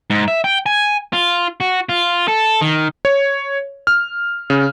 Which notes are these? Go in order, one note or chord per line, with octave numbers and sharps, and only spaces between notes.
G#2
E5
G5
G#5
F4
F#4
F4
A4
D#3
C#5
F6
C#3